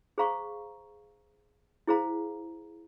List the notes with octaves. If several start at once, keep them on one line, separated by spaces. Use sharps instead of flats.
G#4 C5 F5 A#5 C#6
E4 G#4 C5 F5 A#5